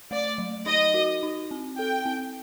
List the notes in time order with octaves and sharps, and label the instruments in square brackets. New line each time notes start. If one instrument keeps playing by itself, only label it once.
[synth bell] A3 [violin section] D5
[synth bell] F#3
[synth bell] D#4 [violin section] D#5
[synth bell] F#4
D#4
C4
[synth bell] A4 [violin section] G5
[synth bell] C4